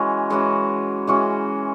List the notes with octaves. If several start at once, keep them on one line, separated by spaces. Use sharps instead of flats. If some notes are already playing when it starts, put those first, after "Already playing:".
Already playing: E3 G#3 C#4 F#4
E3 G#3 C#4 F#4
E3 G#3 C#4 F#4